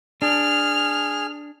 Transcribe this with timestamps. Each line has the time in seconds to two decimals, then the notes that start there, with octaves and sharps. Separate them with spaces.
0.22 D4 G#4 F6